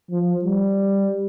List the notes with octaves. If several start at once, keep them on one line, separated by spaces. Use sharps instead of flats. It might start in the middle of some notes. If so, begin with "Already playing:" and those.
F3
G3